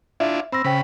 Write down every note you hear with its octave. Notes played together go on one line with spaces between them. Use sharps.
D4 E4 F4 E5
C4 B5 E6 A#6
C#3 C5 G5 B5